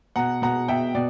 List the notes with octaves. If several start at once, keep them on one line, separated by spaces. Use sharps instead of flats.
B2 F#5 A#5
B2 F#5 A#5
B2 E5 G5
B2 D5